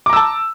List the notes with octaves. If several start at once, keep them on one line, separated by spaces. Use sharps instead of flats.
A5 A#5 D6 E6